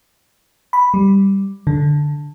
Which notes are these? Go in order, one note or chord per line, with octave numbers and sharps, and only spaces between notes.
B5
G3
D3